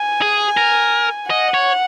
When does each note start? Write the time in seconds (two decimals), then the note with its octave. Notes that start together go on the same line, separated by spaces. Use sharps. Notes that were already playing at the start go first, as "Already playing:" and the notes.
Already playing: G#5
0.22 G#4
0.57 A#4
1.30 D#5 F#5
1.54 C#5